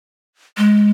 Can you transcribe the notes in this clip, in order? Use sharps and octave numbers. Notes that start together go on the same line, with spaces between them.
G#3